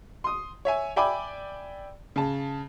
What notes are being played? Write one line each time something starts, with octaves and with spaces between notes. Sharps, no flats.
C6 D#6
C#5 E5 G#5
D5 E5 G5 G#5 B5 D6
C#3 A5